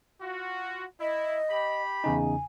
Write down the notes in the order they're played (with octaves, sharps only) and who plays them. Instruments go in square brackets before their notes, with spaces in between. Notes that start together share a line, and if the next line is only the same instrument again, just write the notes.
[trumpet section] F4 F#4
[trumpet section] E4 [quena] D#5
[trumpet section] G4 B5
[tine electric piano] E2 C#3 D#4 [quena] G#5